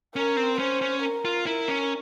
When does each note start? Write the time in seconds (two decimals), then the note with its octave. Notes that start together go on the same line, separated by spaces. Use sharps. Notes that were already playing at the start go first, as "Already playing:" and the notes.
0.15 C#4 A#4
0.37 C4
0.59 C#4 C5
0.81 C#4
1.02 A#4
1.25 F4
1.46 E4 A#4
1.68 C#4